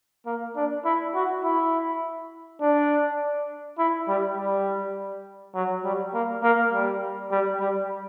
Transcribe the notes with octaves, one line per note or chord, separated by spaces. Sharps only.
A#3
D4
E4
F#4
E4
D4
E4
G3
G3
F#3
G3
A#3
A#3
G3
G3
G3